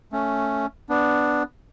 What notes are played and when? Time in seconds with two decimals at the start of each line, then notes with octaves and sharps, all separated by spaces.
0.12 A3 C#4
0.89 B3 D4